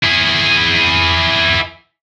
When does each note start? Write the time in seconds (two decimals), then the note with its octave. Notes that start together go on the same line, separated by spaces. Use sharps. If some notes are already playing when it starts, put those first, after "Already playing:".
0.03 E4 G#4